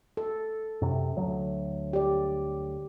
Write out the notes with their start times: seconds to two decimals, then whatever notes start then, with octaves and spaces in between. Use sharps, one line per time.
0.17 A4
0.82 F#2 C3
1.17 D2 F#3
1.93 G4 D5